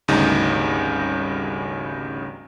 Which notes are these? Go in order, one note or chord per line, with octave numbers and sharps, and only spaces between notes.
G#1 D2 C#3 G3 D#4